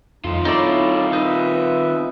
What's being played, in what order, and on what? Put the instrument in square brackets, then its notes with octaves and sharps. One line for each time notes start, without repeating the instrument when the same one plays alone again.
[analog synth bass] F2 [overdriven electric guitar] D#3 F4 [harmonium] D#4
[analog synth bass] C4 [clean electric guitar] D#4 A4 D5 [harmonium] E4 C#5
[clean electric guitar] D#4 [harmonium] B4 E5